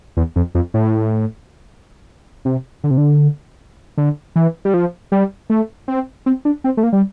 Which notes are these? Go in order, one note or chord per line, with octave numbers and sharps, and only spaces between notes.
E2
F2
F2
A2
C3
D3
C3
D3
D3
E3
G3
F3
G3
A3
C4
C4
D4
C4
A3
A#3
G3